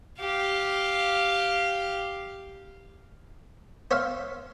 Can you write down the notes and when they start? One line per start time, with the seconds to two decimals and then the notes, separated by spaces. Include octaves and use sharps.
0.20 G4 F5
3.91 C5 C#5 E5 F5 C6